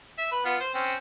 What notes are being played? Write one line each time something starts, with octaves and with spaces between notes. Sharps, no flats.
E5
B4
B3 F4
C5
C4 C#4